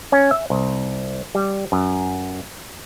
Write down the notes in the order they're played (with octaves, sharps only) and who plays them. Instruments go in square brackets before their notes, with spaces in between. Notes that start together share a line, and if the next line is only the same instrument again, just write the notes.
[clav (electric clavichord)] C#4
E5
C2
G3
F#2